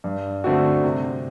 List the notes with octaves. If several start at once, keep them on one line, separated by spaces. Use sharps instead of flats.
G2
D3 A3 C4 F#4
C3